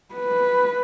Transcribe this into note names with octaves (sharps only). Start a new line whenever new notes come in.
B4